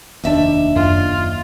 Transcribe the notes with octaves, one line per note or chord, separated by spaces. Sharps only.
F1 D#2 D4 D5 E5
F#2 F4